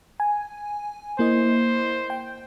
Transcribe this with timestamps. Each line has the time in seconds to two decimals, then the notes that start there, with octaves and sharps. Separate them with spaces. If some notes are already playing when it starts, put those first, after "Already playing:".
0.20 G#5
1.19 A#3 E4 C5 D#5
2.10 G5